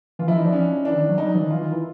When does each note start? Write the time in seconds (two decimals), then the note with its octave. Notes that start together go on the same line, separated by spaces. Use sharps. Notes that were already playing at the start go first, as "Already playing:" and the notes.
0.19 E3 F4
0.27 F3 E4
0.35 E3 D#4
0.44 F3 D4
0.53 C#4
0.85 E3 D4
0.93 D#3
1.09 F#3
1.18 G3 D#4
1.26 F#3
1.34 E3
1.42 D#3
1.50 E3 F4
1.62 D#3
1.72 E3